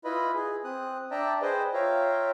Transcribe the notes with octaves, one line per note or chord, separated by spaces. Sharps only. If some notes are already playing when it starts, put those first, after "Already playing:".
E4 F4 B4 D#5 B5
G#4
C4 D#6 F#6
D4 D5 E5 G5 A5 A#5
G#4 B4 C5 D#5 G5
F4 C#5 E5 F5 G5 A#5